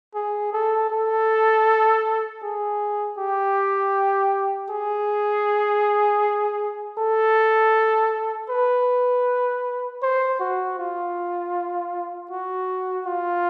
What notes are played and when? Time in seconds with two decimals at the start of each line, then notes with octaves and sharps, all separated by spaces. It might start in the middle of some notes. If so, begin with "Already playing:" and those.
0.15 G#4
0.53 A4
0.90 A4
2.43 G#4
3.18 G4
4.70 G#4
6.99 A4
8.50 B4
10.02 C5
10.40 F#4
10.79 F4
12.31 F#4
13.06 F4